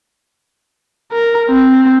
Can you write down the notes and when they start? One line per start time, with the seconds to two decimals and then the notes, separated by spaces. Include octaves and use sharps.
1.12 A#4
1.49 C4